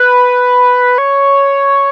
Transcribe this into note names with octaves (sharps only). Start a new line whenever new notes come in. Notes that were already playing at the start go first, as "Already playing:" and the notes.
Already playing: B4
C#5